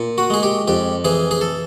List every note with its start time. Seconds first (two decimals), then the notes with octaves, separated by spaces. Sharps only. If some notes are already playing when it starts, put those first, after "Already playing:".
Already playing: A#2
0.18 F#4
0.30 G#3 G#4
0.43 G4
0.68 F2 G4
1.04 E3 G#4
1.31 G#4
1.41 A4